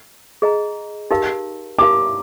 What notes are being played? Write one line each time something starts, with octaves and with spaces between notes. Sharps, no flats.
G#4 D#5 A#5
D#4 G4 A#4 F5
D#4 G4 A#4 F5 D6